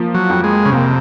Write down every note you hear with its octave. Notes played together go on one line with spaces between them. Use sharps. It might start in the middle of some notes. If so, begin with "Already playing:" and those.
Already playing: F3 A#3
F#3
F2
G#3
C#3
C3 A#3